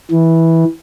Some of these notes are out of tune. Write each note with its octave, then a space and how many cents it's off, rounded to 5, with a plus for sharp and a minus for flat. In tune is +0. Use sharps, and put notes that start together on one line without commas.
E3 -10